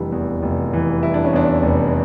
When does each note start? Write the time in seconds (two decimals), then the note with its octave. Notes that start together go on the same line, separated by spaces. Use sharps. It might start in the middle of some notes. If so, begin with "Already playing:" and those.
Already playing: F1 E3 G3 D4
0.12 E2
0.43 F1
0.73 E3
1.03 G3 E4
1.14 D4
1.25 C#4
1.33 E2 D4
1.63 F1